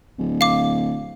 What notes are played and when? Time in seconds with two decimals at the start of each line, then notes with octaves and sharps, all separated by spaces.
0.19 D1
0.41 F5 D6